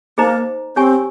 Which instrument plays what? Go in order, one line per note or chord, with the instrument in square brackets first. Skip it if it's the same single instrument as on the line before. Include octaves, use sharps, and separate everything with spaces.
[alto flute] A#3 [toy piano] D#4 G#4 C5 D#5 A#5
[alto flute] C4 [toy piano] G4 C#5 G#5 C#6